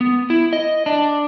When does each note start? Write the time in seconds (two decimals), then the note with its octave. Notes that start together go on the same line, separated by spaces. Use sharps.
0.01 B3
0.30 E4
0.53 D#5
0.86 D4